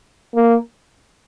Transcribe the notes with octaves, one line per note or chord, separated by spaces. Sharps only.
A#3